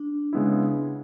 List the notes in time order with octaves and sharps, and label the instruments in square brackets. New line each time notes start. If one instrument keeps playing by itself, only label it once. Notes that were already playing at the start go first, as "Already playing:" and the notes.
Already playing: [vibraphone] D4
[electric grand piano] C#3 G#3 B3 E4